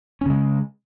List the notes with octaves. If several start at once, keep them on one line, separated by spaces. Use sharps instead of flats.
C#3 G#3 C#4